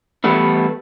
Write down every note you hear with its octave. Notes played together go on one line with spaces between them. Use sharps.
E3 G3 A3 B3 E4